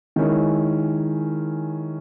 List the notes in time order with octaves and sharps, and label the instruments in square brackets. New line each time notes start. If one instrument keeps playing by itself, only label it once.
[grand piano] D#3 G#3 C#4 E4